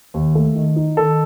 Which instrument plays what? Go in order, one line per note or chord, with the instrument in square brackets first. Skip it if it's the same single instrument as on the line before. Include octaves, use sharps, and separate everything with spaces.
[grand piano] D#2
A3
D#3
D#4
[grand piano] D#3 [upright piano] A4